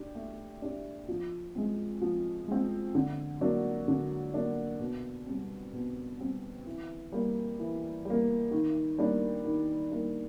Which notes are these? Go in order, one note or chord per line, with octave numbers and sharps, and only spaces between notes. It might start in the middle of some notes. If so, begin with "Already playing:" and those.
Already playing: D4 G4
A3
D4 G4
F3
G#3 C4
F3
G#3 C4
D3
F#3 A#3 D4
D3
F#3 A#3 D4
B2
G3 C4
B2
G3 C4
E3
G3 A#3
E3
G3 A#3
D#3
G3 A#3 D4
D#3
G3 A#3 D4